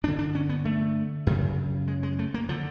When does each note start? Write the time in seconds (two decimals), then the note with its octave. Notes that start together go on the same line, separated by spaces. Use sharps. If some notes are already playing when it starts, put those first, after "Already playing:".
0.03 G2 D4
0.08 D3
0.19 D4
0.35 C#4
0.49 B3
0.65 A3
1.27 F#2 C#3
1.88 G#3
2.03 G#3
2.19 A3
2.34 A#3
2.49 D3 F3